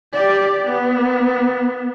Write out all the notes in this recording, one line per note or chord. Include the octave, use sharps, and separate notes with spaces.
G4 D5
B3